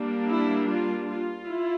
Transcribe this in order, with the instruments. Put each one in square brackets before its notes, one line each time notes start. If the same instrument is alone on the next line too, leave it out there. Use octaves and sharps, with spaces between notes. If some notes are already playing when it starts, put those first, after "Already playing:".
Already playing: [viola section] G3 A#3 D4
E4
F4
F4
E4